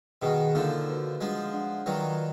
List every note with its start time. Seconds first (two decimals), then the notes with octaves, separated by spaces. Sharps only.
0.22 B2 D#3 G#4 D#5 F#5
0.55 D3 F3 A#3 D#4 A#4 D#5
0.88 F#4 B4 F5
1.21 F3 G#3 D4 G#4 D#5 F#5
1.54 D4 G#4 D#5 F#5
1.86 D#3 F#3 F4 B4 D5 F5